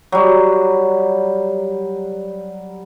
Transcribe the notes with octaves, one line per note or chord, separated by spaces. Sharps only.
F#3 G3